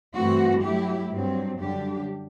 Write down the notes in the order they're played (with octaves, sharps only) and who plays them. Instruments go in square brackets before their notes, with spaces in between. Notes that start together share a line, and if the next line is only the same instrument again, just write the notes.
[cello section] G2 E3 A3 C4 F#4
F#3 A3 E4 G4
G2 F#3 C4
F#2 D3 G3 D4 G4